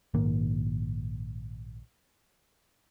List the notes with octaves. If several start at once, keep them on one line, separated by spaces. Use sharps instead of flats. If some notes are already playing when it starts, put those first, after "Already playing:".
A#1 G#2 D#3 A#3